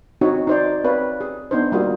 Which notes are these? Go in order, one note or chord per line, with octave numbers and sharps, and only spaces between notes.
C4 D#4 F#4 C#5
D#4 C5 D5
C4 B4 C#5 D5 F5
G#4
B3 D4 D#4 C5
G3 A#3 F4 F#4 G#4